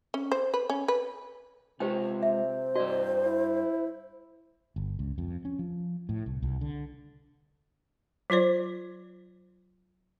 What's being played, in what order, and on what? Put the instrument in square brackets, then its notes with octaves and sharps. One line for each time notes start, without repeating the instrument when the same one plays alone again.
[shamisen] C#4
C5
B4
C#4
B4
[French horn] C3 [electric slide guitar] G#3 F4 [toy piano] G4 C5 G5
[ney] C5 [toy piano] E5
[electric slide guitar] G2 D#5 [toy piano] F#4 D5
[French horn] E4
[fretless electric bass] G1
C#2
F2
C#4
F3
A2
C2
C2
D3
[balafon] F#3 F4 C5 D5